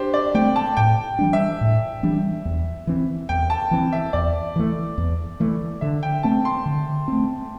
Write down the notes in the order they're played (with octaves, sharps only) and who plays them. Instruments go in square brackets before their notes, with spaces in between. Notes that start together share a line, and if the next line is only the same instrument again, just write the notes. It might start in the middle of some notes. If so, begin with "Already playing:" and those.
Already playing: [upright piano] D4 G4 C5
D5
[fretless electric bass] A3 C4 [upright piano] G5
[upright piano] A5
[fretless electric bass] A2 [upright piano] G5
[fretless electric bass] E3 G3 D4
[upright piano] E5
[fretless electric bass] A2
E3 G3 D4
E2
E3 C4
[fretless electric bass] E2 [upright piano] G5
[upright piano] A5
[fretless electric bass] E3 C4
[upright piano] E5
[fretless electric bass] E2 [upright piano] D5
[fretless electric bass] E3 A3
E2
E3 A3
[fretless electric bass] D3 [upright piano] E5
[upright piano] G5
[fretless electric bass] A3 C4 [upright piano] A5
[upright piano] C6
[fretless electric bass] D3
A3 C4